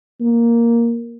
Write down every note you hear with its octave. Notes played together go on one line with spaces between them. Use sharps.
A#3